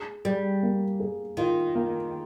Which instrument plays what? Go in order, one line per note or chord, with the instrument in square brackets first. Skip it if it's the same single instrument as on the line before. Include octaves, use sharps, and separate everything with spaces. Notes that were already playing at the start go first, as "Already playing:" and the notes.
Already playing: [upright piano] G#4
[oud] G3 [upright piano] G#4
[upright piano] A#3
G#4
[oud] D#3 [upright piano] F4
[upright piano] A#3